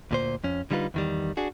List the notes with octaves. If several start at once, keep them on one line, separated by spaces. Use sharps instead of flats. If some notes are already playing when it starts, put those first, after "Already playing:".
D2 A#2 C5
F2 C#4
D3 G3 D#4 F4 B4
E2 D#3 G3
D4 F#4 G#4